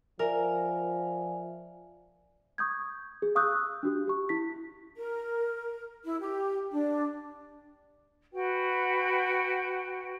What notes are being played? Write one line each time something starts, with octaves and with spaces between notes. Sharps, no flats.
F3 A#4 D5 E5 G#5
C#6 D#6 G6 G#6
G#4
F5 C#6 D#6 E6 F#6 G6
D4 F#4 G4
G4 C#6
E4 B6
A#4
E4
G4
D4
F#4 B4 G5